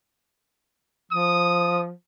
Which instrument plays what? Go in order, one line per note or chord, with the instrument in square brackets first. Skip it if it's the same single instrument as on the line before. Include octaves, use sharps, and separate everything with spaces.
[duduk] F3 [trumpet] D#6